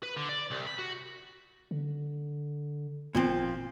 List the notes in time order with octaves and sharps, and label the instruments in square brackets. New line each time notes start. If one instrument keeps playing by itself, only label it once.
[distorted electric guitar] B4
D3
D5
C2
B5
F#4
[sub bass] D3
[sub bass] G#1 [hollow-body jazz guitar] A#2 F3 C4